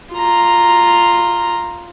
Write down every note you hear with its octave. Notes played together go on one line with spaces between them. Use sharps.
F4 A#5